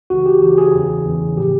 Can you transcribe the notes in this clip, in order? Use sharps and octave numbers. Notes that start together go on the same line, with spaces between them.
C#2 C#3 E3 F#4
G4
C#2 C#3 E3 G4
G#4
E2 C#3 E3
E2 C#3 E3
A2 F3 G4